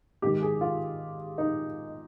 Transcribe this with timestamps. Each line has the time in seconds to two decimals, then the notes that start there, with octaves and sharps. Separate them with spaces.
0.22 G#2 D#3 G#3 G4
0.42 G#4
0.61 F4
1.38 D#4